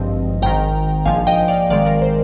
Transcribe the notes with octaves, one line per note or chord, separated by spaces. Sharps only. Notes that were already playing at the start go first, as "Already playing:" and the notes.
Already playing: G#1 G2 F3 C4 D#5
G#1 G#2 D#3 G5 A#5
A#1 G#2 F3 F5 G#5
D#5 G5
D5 F5
G#1 G#2 D#3 G#3 D5 F5
A#4 D5
C5